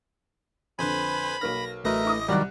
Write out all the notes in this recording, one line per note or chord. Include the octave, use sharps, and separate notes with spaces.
F2 D3 B4 C5 G#5 B5
B1 A#3 F6 A#6
A1 F#3 A3 A#4 B4 D#5 E5 A#6
E4 D6 D#6
C2 D#3 F#3 G3 A#4 D5 F#6